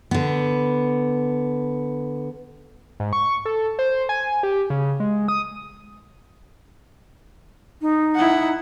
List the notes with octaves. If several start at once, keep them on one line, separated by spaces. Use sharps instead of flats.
D3 B3
G#2
C#6
A4
C5
G#5
G4
C#3
G#3
D#6
D#4
E4 F#5